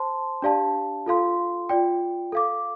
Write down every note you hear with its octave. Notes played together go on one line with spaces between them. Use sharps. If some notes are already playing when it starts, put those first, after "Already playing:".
Already playing: C5 A5 C6
D4 G4 D5 F5 A5
F4 A4 F5 C6
F4 D5 G5
A4 F5 D6